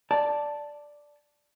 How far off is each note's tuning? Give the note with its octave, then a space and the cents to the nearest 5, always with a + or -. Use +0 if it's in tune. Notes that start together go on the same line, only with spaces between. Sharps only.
D5 +0 A5 +0